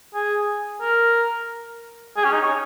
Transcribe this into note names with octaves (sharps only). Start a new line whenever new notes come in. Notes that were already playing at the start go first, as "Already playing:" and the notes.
G#4
A#4
G#4
C#4
D#4
C#5